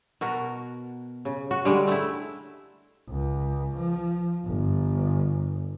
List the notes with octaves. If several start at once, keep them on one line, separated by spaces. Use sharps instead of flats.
B2 F#4 A#4
C#3
F#4
D3 G3 G#3
A3 E4
C#2
F3
G1